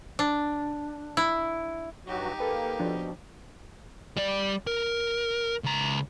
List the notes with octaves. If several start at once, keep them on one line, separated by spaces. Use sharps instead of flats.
D4
E4
G2 F#3 D#4 F#4 G4
A#3 A4 B4 G5
B2 F3 D4
G3 D5
A#4
C#2 A#5